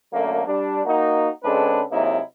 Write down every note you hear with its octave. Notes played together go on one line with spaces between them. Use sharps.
F#2 D3 F#3 A3 A#3
G3 D4
A#3 D#4 F#4
C#3 G#3 C4 D4 A4 B4
C3 F#3 G#3 A#3 D#4 E4